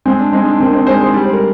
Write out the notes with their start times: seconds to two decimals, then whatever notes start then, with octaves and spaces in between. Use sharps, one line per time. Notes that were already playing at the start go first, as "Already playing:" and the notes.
0.05 G#3 C4
0.19 D4
0.32 G#3 C4 D#4
0.46 D4
0.60 D#3 C4
0.73 C4 D#4
0.87 G#3 G#4 C5
1.00 G#4 C5
1.14 G3 D5
1.24 C5
1.33 A#4